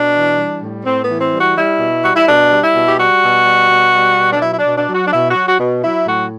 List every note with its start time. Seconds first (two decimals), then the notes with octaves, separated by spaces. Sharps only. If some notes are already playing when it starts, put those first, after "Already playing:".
Already playing: B2 D4
0.14 E3
0.37 G3
0.61 A2
0.85 A2 C4
1.02 B3
1.09 E3
1.20 C4
1.32 G3
1.38 F#4
1.56 G3 E4
1.79 B2
2.03 G3 F#4
2.15 E4
2.27 B2 D4
2.51 G3
2.62 E4
2.74 B2
2.88 G4
2.98 G3 F#4
3.21 B2
3.46 G3
3.69 B2
3.93 G3
4.17 B2
4.33 D4
4.40 F#3 E4
4.51 E4
4.58 D4
4.64 B2
4.76 D4
4.88 F#3
4.94 F#4
5.06 D4
5.12 B2 E4
5.29 F#4
5.35 F#3
5.47 F#4
5.59 B2
5.82 F#3 E4
6.06 A2 F#4